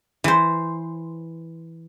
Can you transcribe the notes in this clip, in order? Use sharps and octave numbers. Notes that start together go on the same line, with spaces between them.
E3 C5